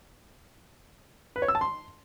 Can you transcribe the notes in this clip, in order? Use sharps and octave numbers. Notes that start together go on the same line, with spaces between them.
B4
C#5
E6
A5
C6